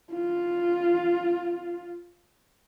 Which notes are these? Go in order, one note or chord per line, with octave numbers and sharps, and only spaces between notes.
F4